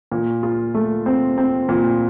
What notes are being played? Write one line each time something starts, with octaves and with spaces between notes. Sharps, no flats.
A#2
F4
A3
C4
C4
A#2